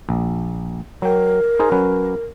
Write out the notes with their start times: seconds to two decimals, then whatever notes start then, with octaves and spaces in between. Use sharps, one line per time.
0.09 A#1
1.02 F#3 A#4 G5
1.59 D#4 G#4 C5
1.72 F#3 C#4 B4